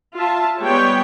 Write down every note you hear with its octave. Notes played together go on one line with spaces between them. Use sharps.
F4 E5 A5
G3 G#3 B3 C#5 G5